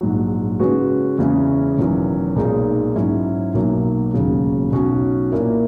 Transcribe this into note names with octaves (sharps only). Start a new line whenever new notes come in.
A#1 G#2 F#3
C#3 G#3 C#4 F#4 B4
E2 C#3 G#3 C#4 E4
E1 E2 D#3 F#3 C#4
B1 A#2 G#3 D#4
G#2 F#3 C#4 E4
B1 B2 F#3 A#3
E1 D#2 C#3 F#3
B1 B2 F#3 C#4 F#4
A#2 A#3 E4 A#4